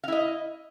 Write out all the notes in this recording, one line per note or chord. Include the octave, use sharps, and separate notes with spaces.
E4 D#5 F5